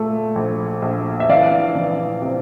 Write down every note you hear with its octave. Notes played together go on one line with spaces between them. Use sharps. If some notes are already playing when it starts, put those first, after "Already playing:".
Already playing: A#2 A3
A#1
A#1
E5
E3 D5 F5
E3
C3